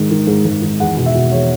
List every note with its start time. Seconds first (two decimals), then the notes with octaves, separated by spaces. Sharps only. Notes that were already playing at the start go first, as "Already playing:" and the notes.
Already playing: G#2 D#3
0.11 D#3
0.27 G#2
0.45 G#2
0.62 D#3
0.80 E2 F#5
0.97 B2
1.06 E5
1.15 B2
1.31 E2 C#5